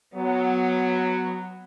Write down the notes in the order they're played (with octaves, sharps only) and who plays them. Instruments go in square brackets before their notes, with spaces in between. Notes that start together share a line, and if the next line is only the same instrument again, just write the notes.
[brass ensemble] F#3 [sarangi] B3